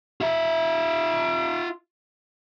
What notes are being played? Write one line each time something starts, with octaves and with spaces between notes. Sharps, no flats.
F4 E5